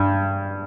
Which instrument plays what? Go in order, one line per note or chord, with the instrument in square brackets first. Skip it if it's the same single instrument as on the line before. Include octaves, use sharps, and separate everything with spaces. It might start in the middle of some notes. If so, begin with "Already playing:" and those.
Already playing: [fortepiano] G2